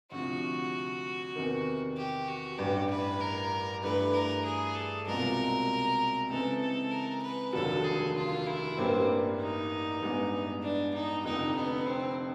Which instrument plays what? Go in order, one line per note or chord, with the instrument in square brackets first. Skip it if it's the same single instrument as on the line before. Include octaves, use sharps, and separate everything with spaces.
[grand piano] D2 C3 F3 [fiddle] F#4
[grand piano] E2 C3 D#3
[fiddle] G4
F#4
[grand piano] A1 G2 E3 [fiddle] G4
[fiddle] B4
A#4
[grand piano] G2 E3 A3 [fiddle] B4
[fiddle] A#4
G#4
A4
[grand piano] C2 B2 G#3 C4 F4 [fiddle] A#4
[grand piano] C#3 E3 G#3 C4 [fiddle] A4
[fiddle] A4
A#4
B4
[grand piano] F1 D#2 D3 F#3 [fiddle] A4
[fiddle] G#4
F4
E4
[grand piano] A1 G2 E3 G3 A#3 [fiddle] C4
[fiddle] D#4
[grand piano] A1 G2 E3 G#3 B3
[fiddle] D4
D#4
[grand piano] F1 F2 D3 [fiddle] D#4
[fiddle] B3
C4